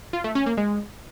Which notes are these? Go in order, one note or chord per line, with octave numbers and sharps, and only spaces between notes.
F4
A3
C#4
A#3
G#3